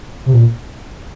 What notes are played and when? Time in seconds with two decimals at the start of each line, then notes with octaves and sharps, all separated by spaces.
0.26 C3
0.33 A#2